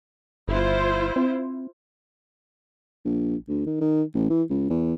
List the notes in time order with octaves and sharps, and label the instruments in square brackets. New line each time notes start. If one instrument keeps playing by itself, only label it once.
[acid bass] G1 [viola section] E4 F4 C5
[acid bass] C4
[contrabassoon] A#1
D2
D#3
D#3
A1
E3
C#2
E2